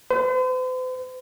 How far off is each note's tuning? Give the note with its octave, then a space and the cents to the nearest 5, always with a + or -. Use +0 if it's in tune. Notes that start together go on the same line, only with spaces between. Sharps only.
C5 -45